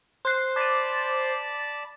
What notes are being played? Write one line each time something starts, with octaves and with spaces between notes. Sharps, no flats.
C5 C6 F#6
D5 A5 B5 D6 A6